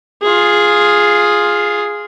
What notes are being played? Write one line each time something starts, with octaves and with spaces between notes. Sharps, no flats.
F4 G#4